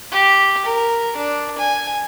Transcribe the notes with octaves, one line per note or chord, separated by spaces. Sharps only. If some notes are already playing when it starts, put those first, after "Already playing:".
G4
A#4
D4
G#5